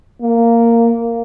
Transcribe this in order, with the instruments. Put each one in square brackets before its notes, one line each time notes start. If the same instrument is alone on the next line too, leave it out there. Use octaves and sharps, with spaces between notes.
[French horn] A#3